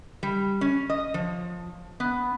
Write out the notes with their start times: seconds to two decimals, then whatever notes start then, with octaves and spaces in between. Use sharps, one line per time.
0.23 G3
0.61 C#4
0.90 D#5
1.14 F3
2.00 B3